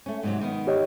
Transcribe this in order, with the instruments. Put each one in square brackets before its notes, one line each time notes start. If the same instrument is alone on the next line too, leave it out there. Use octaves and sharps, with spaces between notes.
[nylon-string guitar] A3 C#4
G#2 C3 F#3
D#3 B3
[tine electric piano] G4 C#5 D#5